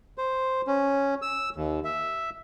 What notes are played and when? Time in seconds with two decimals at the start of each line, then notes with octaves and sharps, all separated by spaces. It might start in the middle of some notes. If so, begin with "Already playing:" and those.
0.18 C5
0.67 C#4
1.22 E6
1.56 D#2
1.85 E5